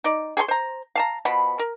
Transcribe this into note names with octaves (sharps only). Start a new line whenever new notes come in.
D#4 D5
G#4 C#5 G#5 C6
C5 A#5
F5 A5 A#5
B2 F3 B3 B5
A#4